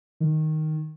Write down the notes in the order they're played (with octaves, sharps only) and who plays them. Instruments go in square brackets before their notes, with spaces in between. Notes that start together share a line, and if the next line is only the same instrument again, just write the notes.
[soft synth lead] D#3